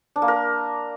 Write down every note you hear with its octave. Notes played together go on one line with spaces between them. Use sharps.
D4
A#3
A#4